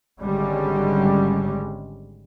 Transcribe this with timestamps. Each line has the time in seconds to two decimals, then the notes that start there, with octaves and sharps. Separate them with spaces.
0.21 G#1 D3 G3 G#3 C#4